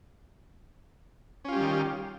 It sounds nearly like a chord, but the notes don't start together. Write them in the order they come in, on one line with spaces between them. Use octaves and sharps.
C#4 F4 G4 G3 D#3